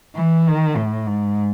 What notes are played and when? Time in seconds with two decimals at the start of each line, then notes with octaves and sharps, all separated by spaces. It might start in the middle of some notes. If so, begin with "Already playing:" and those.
0.16 E3
0.47 D#3
0.77 A2
1.07 G#2